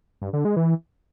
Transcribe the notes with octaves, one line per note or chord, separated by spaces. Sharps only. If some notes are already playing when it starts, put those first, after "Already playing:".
G2
D3
G#3
E3